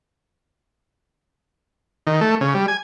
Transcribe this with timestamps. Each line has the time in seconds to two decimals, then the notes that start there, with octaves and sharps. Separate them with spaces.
2.07 D#3
2.21 A3
2.41 C#3
2.55 G3
2.68 G#5